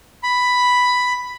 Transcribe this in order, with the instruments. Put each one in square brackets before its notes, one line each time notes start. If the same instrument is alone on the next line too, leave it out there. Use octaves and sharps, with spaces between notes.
[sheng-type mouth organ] B5